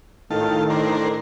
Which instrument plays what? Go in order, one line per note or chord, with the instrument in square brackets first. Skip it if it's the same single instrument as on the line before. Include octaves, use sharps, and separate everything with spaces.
[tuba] A2 [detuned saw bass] D#3 [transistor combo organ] F4 A5 [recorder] A4
[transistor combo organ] D4 A#4 C5